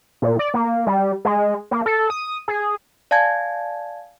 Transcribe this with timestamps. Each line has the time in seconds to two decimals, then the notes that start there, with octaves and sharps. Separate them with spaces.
0.22 A#2
0.39 D5
0.54 A#3
0.87 G3
1.25 G#3
1.71 A#3
1.86 A4
2.10 D#6
2.48 G#4
3.11 D5 F5 G#5 A5 G#6